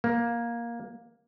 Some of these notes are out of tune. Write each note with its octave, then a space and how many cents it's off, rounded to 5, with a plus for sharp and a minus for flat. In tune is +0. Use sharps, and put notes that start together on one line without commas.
A#3 +10